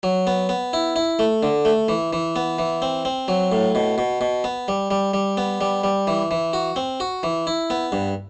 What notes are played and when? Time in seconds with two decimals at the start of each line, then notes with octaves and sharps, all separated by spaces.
0.03 F#3
0.27 B3
0.49 B3
0.73 E4
0.96 E4
1.19 A3
1.43 D3
1.65 A3
1.88 E3
2.13 E3
2.36 B3
2.59 E3
2.82 C4
3.05 C4
3.28 F#3
3.52 A2
3.75 B2
3.98 B2
4.21 B2
4.44 B3
4.68 G3
4.91 G3
5.14 G3
5.37 B3
5.61 G3
5.84 G3
6.07 E3
6.31 E3
6.53 F#4
6.76 C4
7.00 F#4
7.23 E3
7.47 E4
7.70 B3
7.92 G2